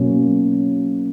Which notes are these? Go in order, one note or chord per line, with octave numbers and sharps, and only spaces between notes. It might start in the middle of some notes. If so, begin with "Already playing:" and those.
Already playing: B2 F#3 A#3 C#4